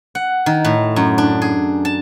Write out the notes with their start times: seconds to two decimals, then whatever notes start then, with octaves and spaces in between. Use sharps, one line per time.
0.15 F#5
0.46 D#3
0.65 A2
0.96 F#2
1.18 D4
1.42 G#4
1.85 A5